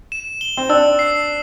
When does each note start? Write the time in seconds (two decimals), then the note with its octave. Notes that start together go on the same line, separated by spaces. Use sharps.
0.12 E7
0.41 G7
0.57 C4
0.69 D4 E6
0.99 C7